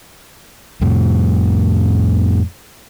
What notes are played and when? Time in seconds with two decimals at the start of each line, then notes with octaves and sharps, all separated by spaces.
0.81 F2 A2 C3